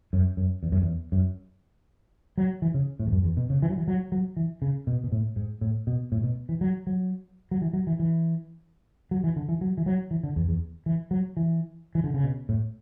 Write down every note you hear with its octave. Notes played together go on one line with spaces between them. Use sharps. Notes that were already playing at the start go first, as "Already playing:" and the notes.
F#2
F#2
E2
F#2
E2
F#2
F#3
E3
C#3
A2
E2
F#2
E2
B2
C#3
E3
F#3
E3
F#3
F#3
E3
C#3
B2
B2
A2
G#2
A2
B2
A2
B2
E3
F#3
F#3
F#3
E3
F#3
E3
E3
F#3
E3
D3
E3
F#3
E3
F#3
E3
D3
E2
E2
E3
F#3
E3
E3
D3
C#3
B2
A2